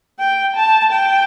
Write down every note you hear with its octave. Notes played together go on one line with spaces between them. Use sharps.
G5
A5
G5